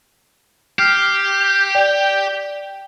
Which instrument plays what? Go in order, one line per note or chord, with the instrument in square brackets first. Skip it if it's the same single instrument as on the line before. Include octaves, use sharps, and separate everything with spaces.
[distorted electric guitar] G4 [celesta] F6 C7
[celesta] D5 G5